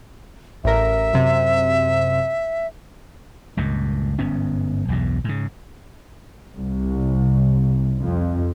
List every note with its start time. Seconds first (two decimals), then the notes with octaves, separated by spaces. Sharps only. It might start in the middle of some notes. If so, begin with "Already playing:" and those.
0.64 A1 A#4 E5
1.13 F#2 C3
3.57 C#2 G2 A#2
4.19 G1 G#2 B3 C#4
4.88 B1 E2 G2 B2
5.24 G#2 C#3
6.58 C2
8.01 F2